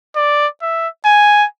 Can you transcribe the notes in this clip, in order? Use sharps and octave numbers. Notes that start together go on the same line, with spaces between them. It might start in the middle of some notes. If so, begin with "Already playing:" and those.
D5
E5
G#5